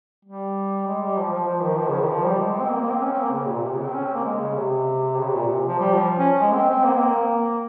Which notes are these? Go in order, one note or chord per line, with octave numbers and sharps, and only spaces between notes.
G3
G#3
G3
F3
F3
F3
D#3
F3
C#3
D#3
F3
G3
G#3
G#3
C4
A#3
A#3
C4
C#4
C4
A#3
C#3
A#2
C3
C#3
C4
C#4
C4
A#3
G#3
C#3
C3
C#3
C3
A#2
C3
F3
G3
F3
C#4
G#3
C4
C4
A#3
C4
A#3